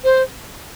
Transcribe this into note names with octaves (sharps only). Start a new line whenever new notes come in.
C5